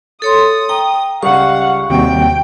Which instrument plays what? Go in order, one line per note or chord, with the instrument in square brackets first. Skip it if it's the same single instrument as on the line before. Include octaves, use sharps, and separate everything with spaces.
[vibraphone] A4 C#5 C6 [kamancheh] D#6
[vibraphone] G5 [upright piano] A#5
[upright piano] C#2 G3 [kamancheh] F5 F#5 [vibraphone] C#6
[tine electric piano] D#2 G3 F#4 [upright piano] C3 [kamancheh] G5